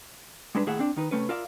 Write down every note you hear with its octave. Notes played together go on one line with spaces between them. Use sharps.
G3 G#3 D4 B4
D#2 A2 G#4 E5 F#5
C4 D4
D#3 D#4 B4
C3 F#3 A3 C#4 B4
F4 A#4 D5 E5 F5